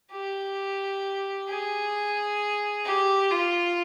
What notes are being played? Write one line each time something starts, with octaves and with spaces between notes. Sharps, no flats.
G4
G#4
G4
F4